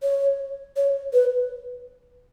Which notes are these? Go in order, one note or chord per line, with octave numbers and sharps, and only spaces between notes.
C#5
C#5
B4